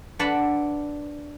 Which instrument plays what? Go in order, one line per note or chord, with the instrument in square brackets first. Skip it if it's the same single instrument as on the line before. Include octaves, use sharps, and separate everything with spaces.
[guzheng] D4 B4 D5 F#5 A5 B5